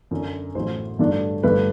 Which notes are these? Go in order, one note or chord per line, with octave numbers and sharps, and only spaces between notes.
F#2 D3 F#3
A1 A2 F#3 C5
G2 D3 F#3 A3 D4
G1 G2 D3 A3 B4